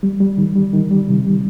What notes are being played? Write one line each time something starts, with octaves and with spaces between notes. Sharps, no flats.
G3
G3
D#3
G3
D#3
G3
C3
G3